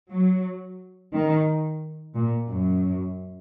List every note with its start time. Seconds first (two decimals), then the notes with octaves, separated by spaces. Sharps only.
0.10 F#3
1.13 D#3
2.15 A#2
2.49 F#2